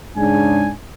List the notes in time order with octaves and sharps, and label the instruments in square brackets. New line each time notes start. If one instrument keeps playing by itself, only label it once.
[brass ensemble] G#2 C#3 D4 G#5